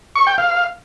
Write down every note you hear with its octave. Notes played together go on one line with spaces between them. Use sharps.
C#6
G5
F5